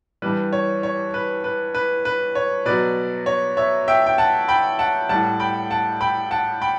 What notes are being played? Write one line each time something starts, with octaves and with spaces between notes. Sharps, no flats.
G2 E3 G3 B4
C#5
C#5
B4
B4
B4
B4
C#5
B2 F#3 B4 D5
C#5
C#5 E5
E5 G5
G5
F#5 A5
G5 B5
F#5 A5
A2 G3 F#5 A5
G5 B5
F#5 A5
G5 B5
F#5 A5
G5 B5